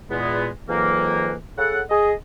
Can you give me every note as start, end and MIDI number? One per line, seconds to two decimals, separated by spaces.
0.11 0.48 40
0.11 0.48 46
0.11 0.48 56
0.11 0.48 59
0.69 1.34 41
0.69 1.34 44
0.69 1.34 52
0.69 1.34 54
0.69 1.34 58
1.58 1.81 49
1.58 1.81 69
1.58 1.81 78
1.90 2.12 68
1.90 2.12 75